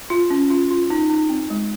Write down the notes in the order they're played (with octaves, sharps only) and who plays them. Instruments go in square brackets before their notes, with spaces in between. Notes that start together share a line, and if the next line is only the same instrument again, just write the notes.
[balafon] F4
C#4
F4
F4
D#4
D#4
C4
G#3